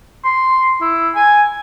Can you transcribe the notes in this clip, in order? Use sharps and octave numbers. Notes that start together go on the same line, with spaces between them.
C6
E4
G#5